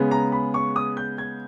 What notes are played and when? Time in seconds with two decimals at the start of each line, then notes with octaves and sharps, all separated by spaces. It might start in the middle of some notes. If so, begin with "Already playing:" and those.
Already playing: C#3 G#3 B3
0.11 A#5
0.32 B5
0.54 C#6
0.76 D#6
0.97 G6
1.18 G#6